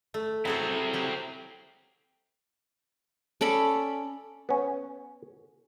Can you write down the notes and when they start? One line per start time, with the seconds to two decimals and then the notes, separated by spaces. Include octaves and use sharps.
0.14 A3
0.45 F#3 C4 E4 G#4 A4
0.94 F#3 G4
3.41 C#4 A4 D5 B5
4.49 B3 C#4